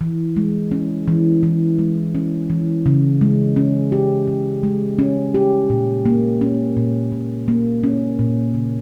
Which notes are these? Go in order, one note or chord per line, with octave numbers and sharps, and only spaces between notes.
E3
G#3
C#4
E3
E3
G#3
C#4
E3
C#3
G#3
C#4
G4
C#3
G#3
C#4
G4
A#2
A#3
C#4
A#2
A#2
A#3
C#4
A#2
C#3